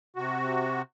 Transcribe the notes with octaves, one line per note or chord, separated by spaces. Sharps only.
C3 F#4